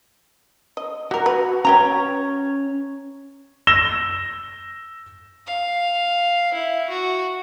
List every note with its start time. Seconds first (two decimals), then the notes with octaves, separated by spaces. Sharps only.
0.77 D#5
1.11 G3 F#4 A#4
1.26 B4
1.65 C#4 B4 C#5 G5 A#5
3.67 E6 A#6 E7 G7
5.46 F5
6.53 E4
6.90 F#4